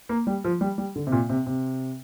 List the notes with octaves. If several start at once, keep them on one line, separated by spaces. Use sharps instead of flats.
A#3
G3
F3
G3
G3
D3
C3
A#2
C3
C3